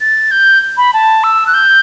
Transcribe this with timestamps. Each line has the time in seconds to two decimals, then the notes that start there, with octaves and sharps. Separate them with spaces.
0.01 A6
0.31 G6
0.77 B5
0.93 A5
1.24 E6
1.47 F#6
1.54 G6